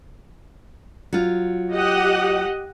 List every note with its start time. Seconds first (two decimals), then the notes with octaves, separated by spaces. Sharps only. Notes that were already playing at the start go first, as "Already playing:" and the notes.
1.13 F#3 F4
1.73 G4 D#5 F#5